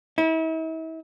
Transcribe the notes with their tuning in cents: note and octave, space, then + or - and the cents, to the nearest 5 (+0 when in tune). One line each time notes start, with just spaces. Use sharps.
E4 -40